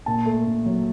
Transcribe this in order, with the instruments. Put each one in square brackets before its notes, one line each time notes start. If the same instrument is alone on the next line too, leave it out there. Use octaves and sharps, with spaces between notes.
[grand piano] A#2 A5
A3
A#2
F#3